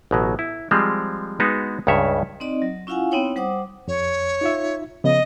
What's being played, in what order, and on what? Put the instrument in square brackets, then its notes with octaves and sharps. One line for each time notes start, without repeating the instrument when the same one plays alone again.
[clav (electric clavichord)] A1 B2 F#3
E4
F3 G3 G#3 C4
G#3 B3 D#4 F#4
C#2 G2 C#3 C#5 E5
[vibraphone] C4 D#4 D5 D#5
F#3
C#4 E4 F4 F5 F#5 G#5
B3 C4 D#4 E4 C#5 G5
G3 C5 F#5 D6 D#6
[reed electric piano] F2 [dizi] C#5
[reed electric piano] D#4 F4 E5
[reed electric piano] C#3 F3 B3 [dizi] D#5